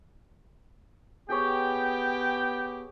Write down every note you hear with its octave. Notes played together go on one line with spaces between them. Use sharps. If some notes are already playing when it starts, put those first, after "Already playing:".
B3 G4 G#4 C#5 G5